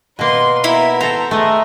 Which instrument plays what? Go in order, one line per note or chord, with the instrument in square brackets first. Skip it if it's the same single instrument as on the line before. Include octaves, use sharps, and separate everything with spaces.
[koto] B2 A#3 [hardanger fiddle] B4 C6
[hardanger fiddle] B3 A#4 [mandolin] E4
[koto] A4 C5 [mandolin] A#5
[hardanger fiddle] G#3 E5 [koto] A3 D#5